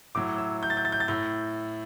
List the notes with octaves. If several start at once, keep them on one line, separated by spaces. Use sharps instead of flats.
A2 F#3 D6
E6
G6
A6
G6
A6
G6
A6
A2 G6